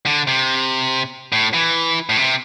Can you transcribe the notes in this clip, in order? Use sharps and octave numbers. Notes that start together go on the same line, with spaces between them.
D3
C3
A2
E3
A2
C3